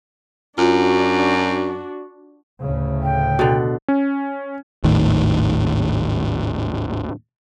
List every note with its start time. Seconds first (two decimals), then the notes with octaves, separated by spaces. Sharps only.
0.58 F#2 D4 F4 F#4
2.61 D2 A2 C#3
3.03 G5
3.39 B2 D3
3.88 C#4
4.84 G#1 D#2 A2 D#3